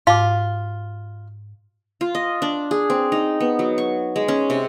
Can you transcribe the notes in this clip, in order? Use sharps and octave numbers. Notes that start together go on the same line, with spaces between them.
G#2 F4 D6
F4
D#5
D4
G#4
C4
D#4
B3
F#3
C#6
G#3
C#4
C3